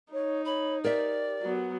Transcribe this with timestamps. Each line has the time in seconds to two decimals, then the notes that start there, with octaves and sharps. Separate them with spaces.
0.13 D#4 C#5
0.45 C#5 B5
0.84 G4 A#4 C5 D5 E5
1.43 F#3 B3